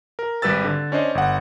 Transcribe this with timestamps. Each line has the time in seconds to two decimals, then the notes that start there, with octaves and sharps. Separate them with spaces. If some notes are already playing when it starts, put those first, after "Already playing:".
0.19 A#4
0.42 G#1 G3 G4 B4 E6 A6
0.64 D3
0.92 C#4 D4 C5 D#5
1.15 G1 F#5